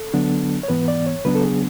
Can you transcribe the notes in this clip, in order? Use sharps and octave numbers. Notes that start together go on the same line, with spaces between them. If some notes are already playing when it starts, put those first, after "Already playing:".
Already playing: A4
D3 F#3 B3 D4
C#5
G#2 E3 B3 B4
D5
C#5
C#3 F#3 B3 D4 B4
A4
G#4